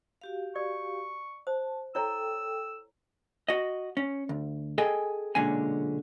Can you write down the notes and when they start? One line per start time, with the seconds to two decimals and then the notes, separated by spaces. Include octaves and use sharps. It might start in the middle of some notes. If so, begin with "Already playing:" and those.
0.21 F#4 G4 F5
0.56 D5 C#6
1.47 C5 A5
1.95 E4 A4 C#5 G5 A#5 E6
3.48 F#4 D#5
3.97 C#4
4.29 D2
4.78 G#4 A4 D#5 G5 G#5
5.35 B1 A#2 D3 G#3 C#4 G#5